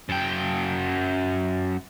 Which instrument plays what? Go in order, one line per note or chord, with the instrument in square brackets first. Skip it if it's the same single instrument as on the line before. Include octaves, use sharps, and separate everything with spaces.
[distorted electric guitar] F#2 G5